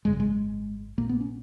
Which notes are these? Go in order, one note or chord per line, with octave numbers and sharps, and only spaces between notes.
G#1 F#2 C#3 G#3
G3
G#3
A#1 A#2 A#3
B3
C#4